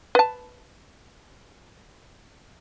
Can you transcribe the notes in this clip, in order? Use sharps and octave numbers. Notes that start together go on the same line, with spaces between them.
B4 A5